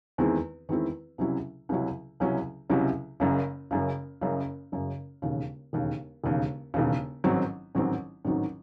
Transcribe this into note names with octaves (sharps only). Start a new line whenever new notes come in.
E2 D#3 G#3 C4 E4
E2 D#3 G#3 C4 E4
C#2 C3 F#3 C#4 E4
C#2 C3 F#3 C#4 E4
C#2 C3 F#3 C#4 E4
C#2 C3 F#3 C#4 E4
F#1 F#2 C#3
F#1 F#2 C#3
F#1 F#2 C#3
F#1 F#2 C#3
E1 D#2 C#3
E1 D#2 C#3
E1 D#2 C#3
E1 D#2 C#3
A1 G#2 D#3 F#3 C4
A1 G#2 D#3 F#3 C4
A1 G#2 D#3 F#3 C4